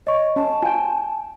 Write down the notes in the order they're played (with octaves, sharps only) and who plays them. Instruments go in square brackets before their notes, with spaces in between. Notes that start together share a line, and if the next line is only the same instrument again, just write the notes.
[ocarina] C#5 [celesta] D#5 C#6
[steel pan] C#4 [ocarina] A5
[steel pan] F4 G5 [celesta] G#5